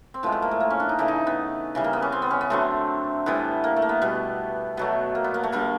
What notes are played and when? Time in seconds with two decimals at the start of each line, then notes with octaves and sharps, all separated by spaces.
0.14 C4
0.23 A2 F3 G#3 B3
0.32 A3
0.42 A#3
0.51 A3
0.60 A#3
0.70 C#4
0.80 D4
0.89 D#4
0.99 C#3 E3 A3 E4
1.08 D#4
1.27 B3
1.75 C#3 E3 G3
1.84 A#3
1.93 B3
2.02 C#4
2.12 C4
2.22 B3
2.31 C#4
2.41 B3
2.50 D3 F#3 A3 C4
3.26 A2 E3 G3 B3
3.64 A#3
3.76 A3
3.82 A#3
3.89 B3
4.02 B2 G3 B3
4.77 B2 F#3 A3 B3
5.15 A#3
5.24 B3
5.34 A#3
5.43 A3
5.52 D3 G3 A#3